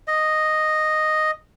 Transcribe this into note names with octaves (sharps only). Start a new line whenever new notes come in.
D#5